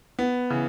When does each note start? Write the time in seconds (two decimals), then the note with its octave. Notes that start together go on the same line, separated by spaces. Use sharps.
0.19 B3
0.50 C#3 E3